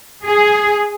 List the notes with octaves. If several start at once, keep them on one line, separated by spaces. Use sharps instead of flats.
G#4